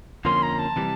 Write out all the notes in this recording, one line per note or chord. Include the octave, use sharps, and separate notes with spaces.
F2 D3 F3 A#3 C#4 C6
A#5
A5
C3 E3 G3